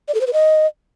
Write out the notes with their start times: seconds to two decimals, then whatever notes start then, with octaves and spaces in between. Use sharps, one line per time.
0.08 D5
0.14 A4
0.21 C5
0.27 B4
0.33 D#5